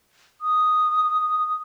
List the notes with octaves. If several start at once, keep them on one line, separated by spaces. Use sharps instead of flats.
D#6